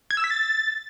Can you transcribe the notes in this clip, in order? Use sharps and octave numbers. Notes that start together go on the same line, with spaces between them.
G#6
E6
B6
A6